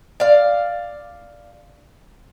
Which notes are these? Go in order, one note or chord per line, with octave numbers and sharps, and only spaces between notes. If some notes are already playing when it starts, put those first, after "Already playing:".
D5 F5